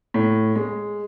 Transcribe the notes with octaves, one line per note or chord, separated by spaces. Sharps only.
A2
G#3